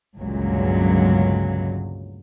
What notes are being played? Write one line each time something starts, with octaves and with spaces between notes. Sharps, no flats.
G1 C#2 A#2 F#3